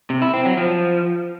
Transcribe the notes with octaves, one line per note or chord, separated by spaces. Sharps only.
C3
E4
C4
F#3
F3